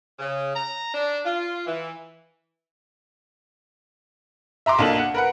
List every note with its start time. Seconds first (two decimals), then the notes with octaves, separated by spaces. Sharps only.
0.19 C#3
0.55 A#5
0.94 D4
1.25 F4
1.67 E3
4.66 E5 A#5 C6 D6
4.78 B1 A#3 D4 A4 F#7
4.98 F#5
5.14 A#4 B4 F#5